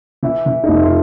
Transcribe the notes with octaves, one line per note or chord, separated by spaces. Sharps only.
E3 E4
E3
D#4
F1 E4
F4